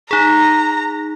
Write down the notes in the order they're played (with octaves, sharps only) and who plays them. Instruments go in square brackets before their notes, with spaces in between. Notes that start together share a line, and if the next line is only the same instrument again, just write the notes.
[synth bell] D#4 G#4 [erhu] A#5